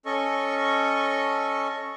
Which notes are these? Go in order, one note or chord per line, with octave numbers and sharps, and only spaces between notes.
C#4 A4 D#5 C#6